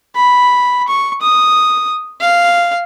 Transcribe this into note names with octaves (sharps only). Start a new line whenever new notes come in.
B5
C#6
D#6
F5